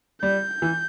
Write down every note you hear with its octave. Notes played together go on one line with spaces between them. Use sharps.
G3 G6
E3